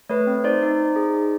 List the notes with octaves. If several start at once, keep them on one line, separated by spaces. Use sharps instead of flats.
A3 B4 C#5
C4
D#4 C5 D5
D#4
D#4
G#4
D#4